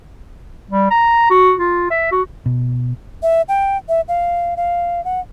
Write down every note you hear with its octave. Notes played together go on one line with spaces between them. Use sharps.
G3
A#5
F#4
F4
E5
F#4
B2
E5
G5
E5
F5
F5
F#5